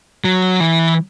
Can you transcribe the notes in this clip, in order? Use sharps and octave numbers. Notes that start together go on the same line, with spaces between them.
F#3
E3